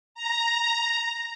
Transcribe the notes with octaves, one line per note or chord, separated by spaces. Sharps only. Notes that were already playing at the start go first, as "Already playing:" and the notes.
A#5